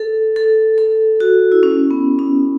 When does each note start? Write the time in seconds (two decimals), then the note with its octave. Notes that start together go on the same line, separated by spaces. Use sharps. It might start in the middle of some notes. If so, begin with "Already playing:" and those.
Already playing: A4
0.36 A4
0.78 A4
1.20 F#4
1.52 E4
1.63 C#4
1.91 B3
2.19 C#4